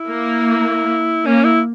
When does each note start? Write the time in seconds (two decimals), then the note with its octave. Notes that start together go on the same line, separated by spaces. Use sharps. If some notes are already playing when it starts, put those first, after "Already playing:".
Already playing: E4
0.09 A#3
1.25 A#3 C#4
1.44 E4